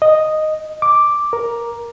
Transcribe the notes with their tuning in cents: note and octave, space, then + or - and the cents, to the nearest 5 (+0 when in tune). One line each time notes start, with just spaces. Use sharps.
D#5 -5
D6 +0
A#4 +10